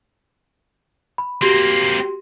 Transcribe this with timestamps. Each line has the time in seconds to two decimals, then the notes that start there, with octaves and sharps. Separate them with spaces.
1.18 B5
1.42 A#3 C4 F#4 G4 C6